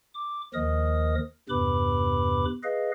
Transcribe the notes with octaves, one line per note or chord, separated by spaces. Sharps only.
D6
D#2 D#3 F3 A#4 D#5 D#6
E2 G2 C3 B4 B5 D6
G#4 B4 D#5 F5